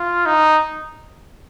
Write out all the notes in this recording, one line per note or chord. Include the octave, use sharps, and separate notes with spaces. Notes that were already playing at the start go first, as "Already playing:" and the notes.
Already playing: F4
D#4